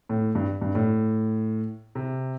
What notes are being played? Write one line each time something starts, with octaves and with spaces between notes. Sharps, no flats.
A2
G2
G2
A2
C3